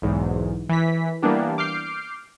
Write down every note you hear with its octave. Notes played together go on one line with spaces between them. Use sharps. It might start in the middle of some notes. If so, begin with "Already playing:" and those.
B1 E2 G#2
E3 B6
E3 G3 A#3 B3 D4 G4
D6 F6 G6 C7 D7